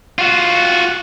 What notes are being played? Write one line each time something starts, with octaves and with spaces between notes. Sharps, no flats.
F4 F#4